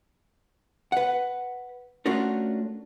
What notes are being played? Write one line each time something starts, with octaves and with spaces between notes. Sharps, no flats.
B4 F#5
A3 C#4 D4 F4 F#4 A#4